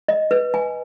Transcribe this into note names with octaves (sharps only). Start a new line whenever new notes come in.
D#5
B4
G#5